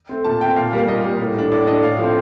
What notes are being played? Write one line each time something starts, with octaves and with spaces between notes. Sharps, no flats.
A3 C4
A#2 A5
A3 C4 G5
A#2 F5
G3 A#3 F5
A#2 D#5
G3 A#3
A2
A3 D4
A2 D5
A3 D4 D#5
A2 F5
F3 A3 C4